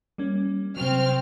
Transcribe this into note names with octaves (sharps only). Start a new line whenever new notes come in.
G3 A#3 C#4
C3 F#3 C4 F6